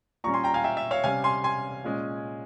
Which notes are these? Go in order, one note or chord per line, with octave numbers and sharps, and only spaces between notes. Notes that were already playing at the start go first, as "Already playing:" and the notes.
A#2 G3 C#4 A#5 C#6
G#5 C6
G5 A#5
F5 G#5
E5 G5
E5
C#5 F5
C3 G3 C#4 F5 G#5
G#5 C6
G#5 C6
A#2 G#3 C#4